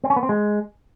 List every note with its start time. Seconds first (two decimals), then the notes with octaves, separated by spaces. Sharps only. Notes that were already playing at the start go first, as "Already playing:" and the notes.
0.04 C4
0.10 C#4
0.16 B3
0.23 C4
0.29 G#3